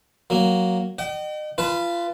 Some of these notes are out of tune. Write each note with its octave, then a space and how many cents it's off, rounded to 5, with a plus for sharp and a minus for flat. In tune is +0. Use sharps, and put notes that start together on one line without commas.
F#3 +0 A#3 +0
D#5 -35 G5 -40
F4 -25 B4 +5 A5 +0